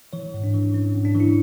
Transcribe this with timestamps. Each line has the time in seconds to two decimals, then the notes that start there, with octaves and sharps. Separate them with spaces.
0.13 E3 C#5
0.34 G#2
0.44 D4
0.54 E3
0.73 E3 C#4
0.95 G#2
1.05 D4
1.15 E3
1.20 E4